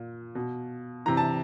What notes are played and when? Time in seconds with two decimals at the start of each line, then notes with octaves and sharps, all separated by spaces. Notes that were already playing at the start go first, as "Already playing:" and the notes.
Already playing: A#2
0.35 B2
1.06 C3 E3 A#5
1.17 A5